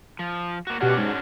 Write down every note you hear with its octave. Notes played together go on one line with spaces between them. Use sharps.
F3
A#3 F#4
B2 C#4 D4 F#4 G4 F#5
G#2